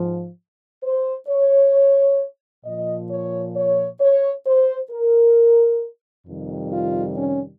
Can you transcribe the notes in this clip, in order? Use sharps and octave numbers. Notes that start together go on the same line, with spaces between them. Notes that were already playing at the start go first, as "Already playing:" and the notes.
Already playing: G#2 F3
C5
C#5
A#2 F3 D#5
C#5
C#5
C#5
C5
A#4
F2 C3 D#3 G3
F4
C#4